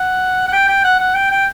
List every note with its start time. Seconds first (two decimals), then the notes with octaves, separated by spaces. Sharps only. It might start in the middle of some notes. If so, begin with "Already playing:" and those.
Already playing: F#5
0.48 F#5
0.53 G5
0.68 G5
0.84 F#5
1.00 F#5
1.15 G5
1.31 G5